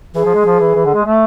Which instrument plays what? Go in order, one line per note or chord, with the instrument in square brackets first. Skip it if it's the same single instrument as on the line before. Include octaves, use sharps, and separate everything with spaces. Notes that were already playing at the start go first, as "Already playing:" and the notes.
[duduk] E3 [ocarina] G#4
[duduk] F3
G#3
F3
E3
E3
D3
G#3
A3